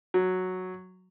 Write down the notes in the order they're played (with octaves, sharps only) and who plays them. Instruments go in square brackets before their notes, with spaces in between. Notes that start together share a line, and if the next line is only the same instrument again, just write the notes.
[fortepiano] F#3